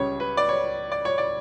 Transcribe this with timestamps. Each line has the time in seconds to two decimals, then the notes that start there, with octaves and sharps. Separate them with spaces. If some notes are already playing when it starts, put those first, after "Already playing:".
Already playing: C#2 C#3 G3 C#5
0.20 B4
0.37 D5
0.49 C#5
0.92 D5
1.05 C#5
1.18 D5